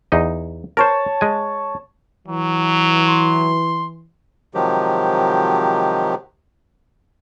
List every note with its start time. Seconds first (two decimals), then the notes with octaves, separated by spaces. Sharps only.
0.12 E2 D#4 D#5
0.77 A#4 C5 C#5 A5
1.21 G#3 G#5
2.28 E3 F#3
3.08 C6
4.55 C3 D#3 F3 F#3 G#3 G4